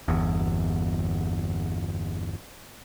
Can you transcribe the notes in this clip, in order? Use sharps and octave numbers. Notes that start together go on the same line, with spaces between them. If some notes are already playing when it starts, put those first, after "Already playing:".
G1 E2